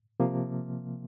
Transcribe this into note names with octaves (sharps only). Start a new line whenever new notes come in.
C3 F3 A#3